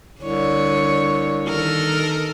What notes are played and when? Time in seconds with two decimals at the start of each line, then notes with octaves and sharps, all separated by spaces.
0.22 C2 D3 C#5
1.48 D#3 A4 A#4